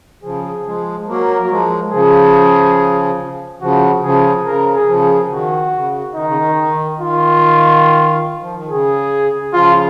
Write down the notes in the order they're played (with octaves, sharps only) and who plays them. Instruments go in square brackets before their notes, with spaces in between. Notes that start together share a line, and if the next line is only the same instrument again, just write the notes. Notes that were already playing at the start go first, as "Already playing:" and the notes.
[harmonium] C#3 F3 [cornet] G#4
[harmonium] F3 G#3
[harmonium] F#3 A#3 [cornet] A#4
[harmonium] F#3
F3 G#3
[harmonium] C#3 F3 [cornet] G#4
[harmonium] C#3 F3 [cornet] F#4
[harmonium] C#3 F3 [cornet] G#4
[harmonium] C#3 [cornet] A#4
[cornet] G#4
[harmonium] C#3 F3
[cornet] G#4
[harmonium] D#3 [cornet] F#4
[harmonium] C#3
[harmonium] D#3 [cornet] D#4
[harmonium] C#3
D#3
D#3
[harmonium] D#3 [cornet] F4
[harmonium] F3
D#3
[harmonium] C#3 [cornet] G#4
[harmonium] C#3 F3 [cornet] F4